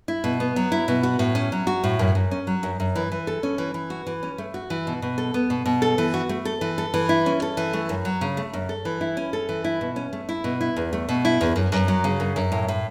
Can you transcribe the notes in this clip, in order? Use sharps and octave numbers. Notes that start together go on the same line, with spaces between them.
E4
B2
B3
F#3
E4
B2
F#4
A2
C#4
F#3
F#4
A2
F#2
F#2
C#4
F#3
F#2
F#2
E3
E3
A4
C#4
E3
E3
F#4
E3
C#4
A3
F#4
E3
B2
B2
A4
B3
B2
B2
A4
E3
F#4
A3
A4
E3
A4
E3
E4
C#4
A4
E3
A3
F#2
F#3
C#3
A3
F#2
A4
E3
E4
C#4
A4
E3
E4
B2
C#4
A3
E4
B2
E4
E2
A3
B2
E4
E2
F#2
F#2
F#3
C#3
F#2
F#2
A2
A2